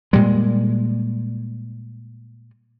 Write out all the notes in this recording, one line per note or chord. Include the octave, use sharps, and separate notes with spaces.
A#2 G3 G#3